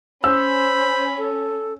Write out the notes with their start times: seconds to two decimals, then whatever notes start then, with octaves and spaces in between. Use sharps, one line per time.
0.24 C#4 C5 B5 E6
1.18 A4